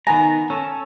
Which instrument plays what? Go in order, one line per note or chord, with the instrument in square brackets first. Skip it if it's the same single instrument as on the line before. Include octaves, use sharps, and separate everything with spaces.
[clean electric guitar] D#3 B3 A#5 [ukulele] G#5
[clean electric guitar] C#4 A4